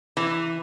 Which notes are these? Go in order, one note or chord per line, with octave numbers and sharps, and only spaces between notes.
E3